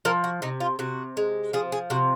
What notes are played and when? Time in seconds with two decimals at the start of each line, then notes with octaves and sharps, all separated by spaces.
0.05 F3 A#4
0.24 F#4
0.42 C3 D#4
0.60 F4
0.79 C3 F#4
1.17 G#3
1.53 F3 G#4
1.72 G#4
1.90 C3 F#4